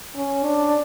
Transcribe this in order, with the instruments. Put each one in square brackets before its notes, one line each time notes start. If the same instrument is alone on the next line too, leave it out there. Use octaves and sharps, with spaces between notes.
[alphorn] C#4
D4